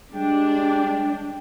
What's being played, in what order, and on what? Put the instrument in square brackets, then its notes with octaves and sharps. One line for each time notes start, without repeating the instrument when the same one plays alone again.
[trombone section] G3 G#3 [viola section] D4 [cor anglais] G5